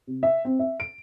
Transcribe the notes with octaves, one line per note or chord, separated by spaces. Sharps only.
C3
E5
C4
E5
D7